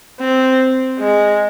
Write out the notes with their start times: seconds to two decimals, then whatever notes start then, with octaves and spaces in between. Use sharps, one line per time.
0.20 C4
0.99 G#3